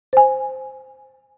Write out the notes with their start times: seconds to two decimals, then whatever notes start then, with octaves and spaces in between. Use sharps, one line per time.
0.13 C5 G#5